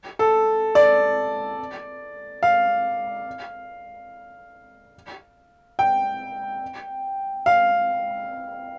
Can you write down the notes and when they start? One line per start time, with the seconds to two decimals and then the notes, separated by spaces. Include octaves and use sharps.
0.19 A4
0.75 D5
2.43 F5
5.79 G5
7.46 F5